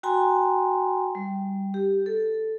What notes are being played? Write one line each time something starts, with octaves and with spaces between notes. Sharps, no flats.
F#4 G5 G#5 A#5 C6
G3
G4
A4